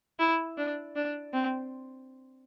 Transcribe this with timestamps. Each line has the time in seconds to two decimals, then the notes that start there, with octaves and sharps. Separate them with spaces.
0.19 E4
0.58 D4
0.96 D4
1.34 C4